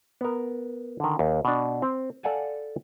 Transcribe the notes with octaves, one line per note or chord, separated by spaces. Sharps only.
B3 A#4
D3 D#3
D#2
B2 D4
C4
A4 D5 F5 F#5 G#5 A5